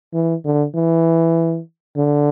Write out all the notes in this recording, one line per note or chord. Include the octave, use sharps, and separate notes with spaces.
E3
D3
E3
D3